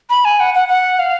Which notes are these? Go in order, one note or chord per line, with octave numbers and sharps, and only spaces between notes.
B5
G#5
F#5
F#5
F#5
F5